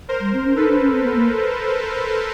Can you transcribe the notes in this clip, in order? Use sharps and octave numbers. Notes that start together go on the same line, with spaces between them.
A#4 C5
G3
C4
C#4
D#4 A4 B4
D4
C#4
C4
B3
A#3